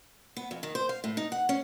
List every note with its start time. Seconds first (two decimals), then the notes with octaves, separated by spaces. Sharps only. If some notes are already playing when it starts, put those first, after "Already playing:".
0.36 B3
0.51 F2
0.63 D#3
0.75 C5
0.89 F5
1.04 A2
1.17 D#4
1.32 F#5
1.49 C#4